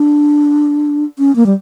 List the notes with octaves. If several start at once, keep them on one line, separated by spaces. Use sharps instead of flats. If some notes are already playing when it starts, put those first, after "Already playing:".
Already playing: D4
C#4
A#3
G3